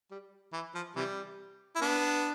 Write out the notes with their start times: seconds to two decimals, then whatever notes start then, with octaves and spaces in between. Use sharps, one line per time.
0.11 G3
0.53 E3
0.75 F3
0.96 C3 E3 G3
1.76 E4
1.81 B3 D4